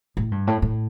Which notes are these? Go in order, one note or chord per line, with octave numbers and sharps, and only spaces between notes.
A2
G2
A2
A2